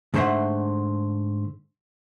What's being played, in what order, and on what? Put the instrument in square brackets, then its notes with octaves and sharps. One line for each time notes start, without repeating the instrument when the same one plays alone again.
[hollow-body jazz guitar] G#2 D3 A3 C5 E5 F#5